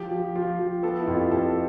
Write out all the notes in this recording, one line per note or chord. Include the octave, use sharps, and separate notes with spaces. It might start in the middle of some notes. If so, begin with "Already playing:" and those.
Already playing: F3 G4
F3
F3 F4
F3
B3 A4
E4
F2 F4
G4
F2 A4